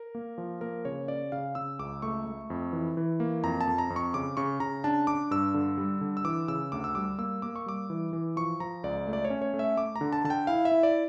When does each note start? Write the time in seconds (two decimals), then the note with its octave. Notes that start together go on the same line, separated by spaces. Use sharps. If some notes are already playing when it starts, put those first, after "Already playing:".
Already playing: A#4
0.15 A#3
0.38 F3
0.61 A#3 A#4
0.85 C#3 C#5
1.08 C#4 D5
1.32 C#3 F5
1.55 C#3 E6
1.79 C#2 D6
2.02 A3 C#6
2.26 A3
2.50 F2
2.73 E3
2.97 E3
3.20 A#3
3.43 F2 A#5
3.61 A5
3.67 F2
3.78 A#5
3.90 F2
3.96 C#6
4.14 C#3 D6
4.37 C#3 C#6
4.60 C#3 A#5
4.84 D4 A5
5.07 D4 D6
5.31 G2 E6
5.54 D3
5.78 G3
6.01 D3
6.17 E6
6.25 E3 D6
6.48 C#3 E6
6.72 D2 D6
6.84 E6
6.95 G3 D6
7.18 A#3 E6
7.42 A#3 D6
7.56 C#6
7.66 G3 D6
7.90 E3
8.13 E3
8.36 F3 C#6
8.60 F3 A#5
8.84 C#2 D5
9.07 A3
9.13 D5
9.25 C#5
9.30 C#4
9.42 C#5
9.54 A3
9.59 E5
9.77 A3 D6
9.96 A#5
10.01 D3
10.13 A5
10.24 D3 A5
10.30 G5
10.47 E4 F5
10.65 E5
10.72 E4
10.83 D5